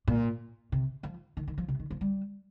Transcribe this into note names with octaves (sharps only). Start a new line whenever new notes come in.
A#2
C3
F3
D#3
D#3
F3
C3
D#3
F3
G3